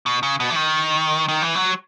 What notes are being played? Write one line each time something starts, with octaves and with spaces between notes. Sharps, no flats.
B2
C#3
B2
E3
D#3
D#3
E3
F#3